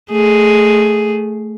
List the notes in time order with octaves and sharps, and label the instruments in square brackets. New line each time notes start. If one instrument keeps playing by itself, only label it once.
[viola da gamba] A3 G#4